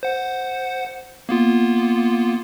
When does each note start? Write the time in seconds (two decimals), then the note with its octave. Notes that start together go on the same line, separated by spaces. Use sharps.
0.03 C5 F#5
1.29 A#3 B3 F4